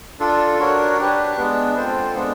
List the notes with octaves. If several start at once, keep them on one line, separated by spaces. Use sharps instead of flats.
D4 F4 A4
D4 F#4 A#4 C#5
D4 G4 B4
G#3 B3 D4
C4 F4 A4 C5
G#3 B3 D4